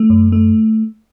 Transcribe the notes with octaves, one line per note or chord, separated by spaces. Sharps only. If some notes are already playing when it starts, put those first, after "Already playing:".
Already playing: A3
F#2
A3